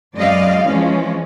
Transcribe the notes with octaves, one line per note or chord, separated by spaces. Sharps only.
F#2 G#3 D5 D#5 F5
E3 F3 G#3 C#4